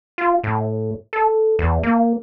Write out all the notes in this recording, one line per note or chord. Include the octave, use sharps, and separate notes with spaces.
F4
A2
A4
E2
A#3